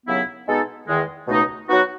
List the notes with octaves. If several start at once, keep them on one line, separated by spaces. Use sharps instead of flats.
D#2 C#3 F#3 B3 E4
B2 G#3 B3 D#4 A4
E2 D#3 G#3
C#2 B2 A3 D#4
F#3 B3 D#4 F#4